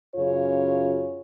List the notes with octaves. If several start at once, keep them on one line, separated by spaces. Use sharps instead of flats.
F#2 C#3 F4 C#5